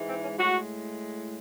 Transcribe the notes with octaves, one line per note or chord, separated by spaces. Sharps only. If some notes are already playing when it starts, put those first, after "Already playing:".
Already playing: G#2 E3 G#3
C4
C#4
A2 G#3 F#4